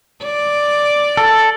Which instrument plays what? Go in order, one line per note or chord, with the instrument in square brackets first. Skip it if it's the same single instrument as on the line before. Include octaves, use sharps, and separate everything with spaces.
[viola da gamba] D5
[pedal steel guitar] A4